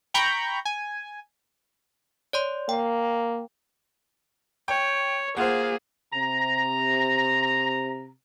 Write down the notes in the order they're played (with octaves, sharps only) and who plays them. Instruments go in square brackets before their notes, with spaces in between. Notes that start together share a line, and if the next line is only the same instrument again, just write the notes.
[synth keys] G5 A#5 B5 C#6 G6
G#5
[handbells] C#5 D5 C6
[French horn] A#3 [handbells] G5
[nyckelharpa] C#5 [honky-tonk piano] G5
[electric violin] A#3 G#4 [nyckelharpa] F4 [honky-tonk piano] C5 F#5
[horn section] C3 A#5